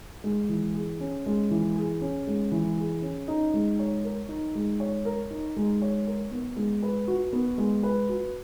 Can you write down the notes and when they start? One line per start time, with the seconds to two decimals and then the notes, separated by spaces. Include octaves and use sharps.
0.24 G#3
0.49 E3
0.74 G#4
1.00 C#4
1.26 G#3
1.51 E3
1.76 G#4
2.01 C#4
2.27 G#3
2.52 E3
2.78 G#4
3.02 C#4
3.28 D#4
3.54 G#3
3.79 C#5
4.04 A#4
4.29 D#4
4.55 G#3
4.80 C#5
5.05 A#4
5.31 D#4
5.56 G#3
5.82 C#5
6.07 A#4
6.31 B3
6.57 G#3
6.83 B4
7.08 F#4
7.33 B3
7.58 G#3
7.83 B4
8.09 F#4